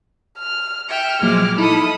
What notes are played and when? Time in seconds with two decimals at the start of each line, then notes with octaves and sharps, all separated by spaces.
0.38 F6
0.89 E5 G5 F6 C#7
1.22 A#2 F3 F#3 G#3 D6
1.58 D#4 E4 A4 B5 D#6